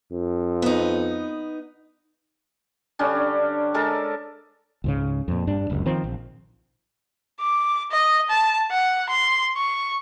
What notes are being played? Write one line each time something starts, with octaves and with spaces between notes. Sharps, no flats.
F2
B3 D#4
D3 G3 C#4 D4
G#3 A4 A#4 A5
C#2 G#2 C#3
F2 A#2
G2 D4
F#1 C#2 F#2
D#3 F3 C4
A#1
D6
D#5
A5
F#5
C6
C#6